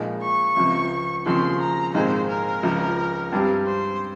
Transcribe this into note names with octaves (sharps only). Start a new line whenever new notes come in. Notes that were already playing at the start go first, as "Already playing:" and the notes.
Already playing: A#1 A#2 G#3 D#4
C#6
C#2 C3 F3
D#2 C#3 F3 C4 C6
A#5
A#1 G#2 D#3 G#3 C4 C5
A#4
C#2 C#3 F3
G2 G3 C4 G4
C5